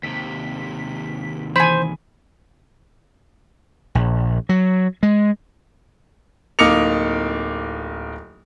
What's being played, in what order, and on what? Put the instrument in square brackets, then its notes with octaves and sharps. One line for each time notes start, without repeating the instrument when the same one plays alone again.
[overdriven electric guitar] D#2 C3 [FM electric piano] B6
[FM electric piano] E3 [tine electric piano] C5 [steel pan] G#5 B5
[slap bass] A#1
F#3
G#3
[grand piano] D1 A#3 D#4 D6 C#7 F7